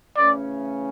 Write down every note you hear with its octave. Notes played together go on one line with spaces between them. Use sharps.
C#3 E3 A3 C#4 D5